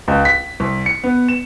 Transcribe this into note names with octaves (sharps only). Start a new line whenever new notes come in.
C#2
B6
C2
C#7
B3
E7